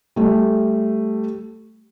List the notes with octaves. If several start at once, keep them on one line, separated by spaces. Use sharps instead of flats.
G3 A3